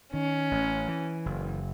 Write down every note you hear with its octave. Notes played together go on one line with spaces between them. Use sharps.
D#3 C#4
A1
E3
F#1